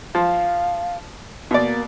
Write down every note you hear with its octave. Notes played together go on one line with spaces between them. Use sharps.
F3 F5
B2 A#3 D5